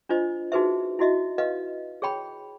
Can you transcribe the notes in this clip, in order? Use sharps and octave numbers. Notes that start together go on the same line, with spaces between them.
D4 F4 C5 D#5
D#4 F#4 G#4 B4 C5 E5
E4 F#4 D#5 E5
B4 D#5 F5
G#4 C#5 G5 B5